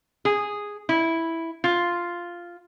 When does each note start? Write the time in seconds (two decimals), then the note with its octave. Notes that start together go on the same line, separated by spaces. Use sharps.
0.25 G#4
0.89 E4
1.64 F4